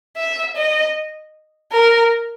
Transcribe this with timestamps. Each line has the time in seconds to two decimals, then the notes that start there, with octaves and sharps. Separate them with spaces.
0.17 E5
0.57 D#5
1.72 A#4